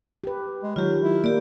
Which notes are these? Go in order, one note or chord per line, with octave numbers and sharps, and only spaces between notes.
G4 B4
G#3
D#3 F#3 F4 G4
E4
A#3 G4 D5